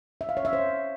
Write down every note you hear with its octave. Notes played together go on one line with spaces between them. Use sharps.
E5
F5
C#5
E5
C5